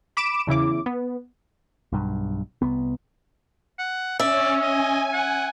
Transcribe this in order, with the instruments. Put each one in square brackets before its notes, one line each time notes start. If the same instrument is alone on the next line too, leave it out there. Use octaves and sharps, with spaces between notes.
[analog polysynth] B5 D6 D7 E7
E2 C#3 E4 D6
B3
[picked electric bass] B1 G2
C2 B3
[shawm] F#5
[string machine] C#4 [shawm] D5 [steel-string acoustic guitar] E5
[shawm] D#5 [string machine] G#5
[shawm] F#5